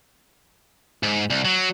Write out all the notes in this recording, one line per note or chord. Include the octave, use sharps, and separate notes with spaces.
G#2
C2
F#3